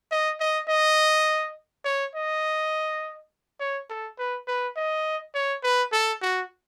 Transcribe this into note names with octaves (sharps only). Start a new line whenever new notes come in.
D#5
D#5
D#5
C#5
D#5
C#5
A4
B4
B4
D#5
C#5
B4
A4
F#4